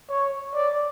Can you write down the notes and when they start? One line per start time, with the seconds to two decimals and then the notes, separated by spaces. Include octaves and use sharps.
0.09 C#5
0.54 D5